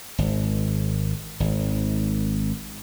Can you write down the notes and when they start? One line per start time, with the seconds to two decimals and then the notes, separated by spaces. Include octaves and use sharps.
0.18 G#1
1.40 G#1